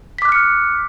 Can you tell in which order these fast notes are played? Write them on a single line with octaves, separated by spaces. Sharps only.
B6 D6 F#6 F6 C#7